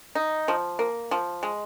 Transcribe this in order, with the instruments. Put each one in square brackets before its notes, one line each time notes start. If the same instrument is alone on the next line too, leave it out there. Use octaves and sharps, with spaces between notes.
[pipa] D#4
F3
A#3
F3
G#3